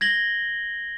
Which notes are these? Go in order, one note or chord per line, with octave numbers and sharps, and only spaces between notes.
G#6 A#6 F#7 G7